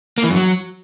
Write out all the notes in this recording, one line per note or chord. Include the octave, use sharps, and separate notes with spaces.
A#3
E3
F#2
F#3